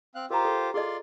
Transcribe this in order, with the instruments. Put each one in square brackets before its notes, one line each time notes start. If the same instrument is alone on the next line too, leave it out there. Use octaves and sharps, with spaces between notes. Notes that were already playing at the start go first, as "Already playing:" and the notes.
[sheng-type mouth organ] C4 F5 F#6
[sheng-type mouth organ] F4 G4 C5 [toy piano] A#4 A#5
[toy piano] A4
[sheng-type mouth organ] F4 D5 C6 [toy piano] G#4 A4 D#5